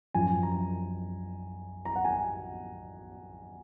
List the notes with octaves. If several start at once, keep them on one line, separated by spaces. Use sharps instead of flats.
F#2 F3 G#5
A#5
A#5
F#5
G#5